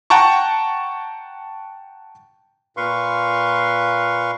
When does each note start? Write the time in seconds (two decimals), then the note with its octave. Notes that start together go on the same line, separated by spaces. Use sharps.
0.10 F#5 G5 A5 A#5 C#6
2.77 A#2 B4 F5 C6 C#6